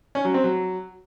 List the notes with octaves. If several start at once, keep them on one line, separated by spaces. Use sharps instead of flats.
C#4
F#3
C4
F#3